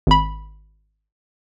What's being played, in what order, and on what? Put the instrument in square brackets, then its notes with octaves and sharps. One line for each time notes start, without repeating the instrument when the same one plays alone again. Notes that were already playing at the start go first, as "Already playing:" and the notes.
[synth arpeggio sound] G#1 B5